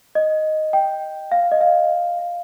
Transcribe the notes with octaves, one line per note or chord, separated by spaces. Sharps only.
D#5
G5
F5
D#5
F5
F5